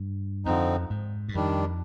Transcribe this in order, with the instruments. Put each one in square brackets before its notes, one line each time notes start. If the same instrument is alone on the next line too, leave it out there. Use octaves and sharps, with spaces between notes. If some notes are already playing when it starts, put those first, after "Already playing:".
Already playing: [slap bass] G2
[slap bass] F2 [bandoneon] D3 F3 C4 D#4
[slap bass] G#2
G2
[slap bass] F2 [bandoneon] D#3 G3 D4